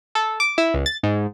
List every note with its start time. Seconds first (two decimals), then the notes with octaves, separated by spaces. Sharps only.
0.15 A4
0.40 D6
0.58 E4
0.74 C#2
0.86 A6
1.03 G#2